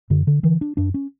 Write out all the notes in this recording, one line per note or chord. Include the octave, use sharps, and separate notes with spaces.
F#2 D3
D3
D3 E3
D4
F#2 D4
C#4